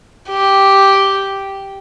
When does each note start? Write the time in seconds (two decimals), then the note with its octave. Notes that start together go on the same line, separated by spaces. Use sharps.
0.29 G4